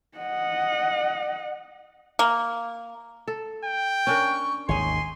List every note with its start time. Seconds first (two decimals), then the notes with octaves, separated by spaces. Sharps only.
0.18 D#5 F#5
2.19 A#3
3.28 A4
3.65 G5
4.07 C#4 D4 A#4 C#6
4.69 G#1 D#2 D#3 G#4 C#5 G#5 C6